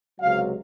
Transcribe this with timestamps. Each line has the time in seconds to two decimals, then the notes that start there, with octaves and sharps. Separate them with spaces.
0.20 C#2 C3 F#3 F5